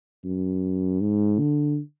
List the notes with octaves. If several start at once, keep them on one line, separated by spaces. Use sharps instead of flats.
F#2
G#2
D3